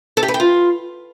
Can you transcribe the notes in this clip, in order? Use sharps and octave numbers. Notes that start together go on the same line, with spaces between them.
A4
G4
B4
G5
F4